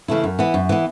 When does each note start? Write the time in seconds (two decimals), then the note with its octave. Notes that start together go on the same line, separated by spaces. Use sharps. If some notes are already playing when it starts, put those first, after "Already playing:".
0.08 C#3 E3 A3 E4
0.24 F#2
0.39 E3 B3
0.54 F#2
0.69 E3 B3